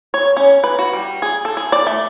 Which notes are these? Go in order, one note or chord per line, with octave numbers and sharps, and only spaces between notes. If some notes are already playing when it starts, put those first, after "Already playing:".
C#5
C#4
B4
F#4
G3
G#4
A4
G#4
D5
A3